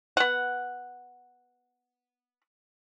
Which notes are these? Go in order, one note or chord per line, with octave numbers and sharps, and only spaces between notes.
B3 F#5